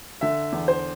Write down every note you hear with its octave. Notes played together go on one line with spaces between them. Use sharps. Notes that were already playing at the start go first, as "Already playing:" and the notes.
D3 E5
E2
C5